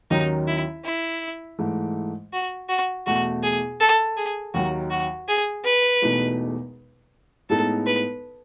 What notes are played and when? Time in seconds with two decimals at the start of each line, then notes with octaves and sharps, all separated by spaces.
0.10 D#2 D#3 F#3 C#4 D#4
0.48 E4
0.85 E4
1.59 G#2 E3 A3
2.33 F#4
2.69 F#4
3.07 E2 B2 A3 E4 F#4
3.43 G#4
3.80 A4
4.17 G#4
4.54 D#2 D#3 F#3 F#4
4.90 F#4
5.28 G#4
5.64 B4
6.02 E1 E2 B2 A3 D#4
7.49 A2 G#3 B3 D#4 A4
7.86 B4